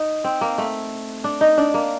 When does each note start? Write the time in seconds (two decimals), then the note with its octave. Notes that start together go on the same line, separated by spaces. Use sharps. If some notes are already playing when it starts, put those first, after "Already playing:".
Already playing: D#4
0.24 C4
0.41 A#3
0.58 A3
1.24 D4
1.41 D#4
1.58 D4
1.74 A#3